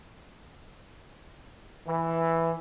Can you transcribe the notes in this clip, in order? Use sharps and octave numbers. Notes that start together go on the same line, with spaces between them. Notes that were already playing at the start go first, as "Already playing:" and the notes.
E3